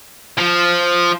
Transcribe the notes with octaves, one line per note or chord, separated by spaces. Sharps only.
F3